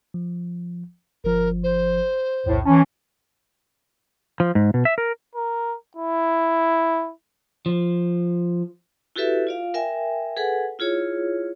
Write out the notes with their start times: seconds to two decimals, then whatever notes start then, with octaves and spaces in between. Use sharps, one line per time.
0.14 F3
1.24 G1 F3 A#4
1.64 C5
2.46 B1 E2 A2
2.65 E3 C#4 A5
4.40 F3
4.55 G#2
4.74 B2
4.85 E5
4.98 A#4
5.35 A#4
5.97 E4
7.66 F3
9.16 E4 F#4 G4 A4 B4 E5
9.47 F4 D5 F5
9.74 A#4 E5 G5 G#5
10.37 G#4 A4 B4 F#5 G#5
10.79 E4 F4 G#4 C#5